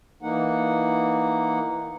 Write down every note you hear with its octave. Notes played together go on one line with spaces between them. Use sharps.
E3 A#3 D#4 F#5